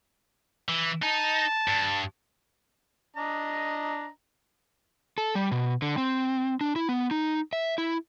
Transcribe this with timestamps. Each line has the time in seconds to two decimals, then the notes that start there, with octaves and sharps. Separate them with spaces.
0.69 E3
1.03 D#4 A5
1.68 G2
3.16 D4 D#5 A#5
5.18 A4
5.35 G3
5.52 B2
5.82 D3
5.98 C4
6.61 D4
6.76 E4
6.89 B3
7.11 D#4
7.53 E5
7.78 E4